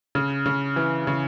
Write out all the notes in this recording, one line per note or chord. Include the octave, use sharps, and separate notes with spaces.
C#3
C#3
E3
C#3